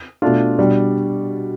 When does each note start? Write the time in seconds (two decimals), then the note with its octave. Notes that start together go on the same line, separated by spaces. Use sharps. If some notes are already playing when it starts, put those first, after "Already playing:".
0.22 B2 A3 D4 F4
0.58 B2 G3 D4